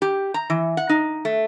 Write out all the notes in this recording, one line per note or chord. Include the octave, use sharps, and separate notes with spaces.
G4
A#5
E3
F#5
D#4
A3